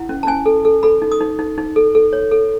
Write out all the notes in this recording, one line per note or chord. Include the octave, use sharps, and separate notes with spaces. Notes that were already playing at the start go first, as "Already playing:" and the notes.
Already playing: E4 F#5
C#4
A5
C#4 G#5
A4
A4
A4 B5
D#4
D#6
D#4
D#4
D#4
A4
A4
C#5
A4